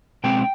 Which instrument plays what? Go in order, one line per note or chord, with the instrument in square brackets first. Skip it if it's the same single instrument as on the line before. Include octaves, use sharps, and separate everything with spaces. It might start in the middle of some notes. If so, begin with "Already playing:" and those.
[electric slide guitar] B2 G#3 C4 G5